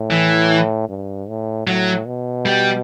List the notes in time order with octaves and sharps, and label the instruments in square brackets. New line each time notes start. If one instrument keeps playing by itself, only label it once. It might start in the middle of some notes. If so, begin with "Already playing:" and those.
Already playing: [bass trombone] A2
[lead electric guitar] E3
[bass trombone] G2
A2
[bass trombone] A2 [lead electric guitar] F#3
[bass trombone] B2
[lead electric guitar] G3